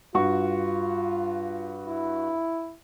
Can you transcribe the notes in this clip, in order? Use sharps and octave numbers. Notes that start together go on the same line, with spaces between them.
G2 F4 F#4 C#6
E4